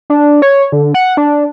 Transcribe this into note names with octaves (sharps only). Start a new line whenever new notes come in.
D4
C#5
D3
F#5
D4